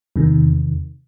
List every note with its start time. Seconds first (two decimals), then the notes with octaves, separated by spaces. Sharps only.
0.16 E2 C3 D#3